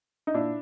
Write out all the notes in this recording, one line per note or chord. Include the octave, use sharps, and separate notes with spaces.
D#4
A#2 D4 E4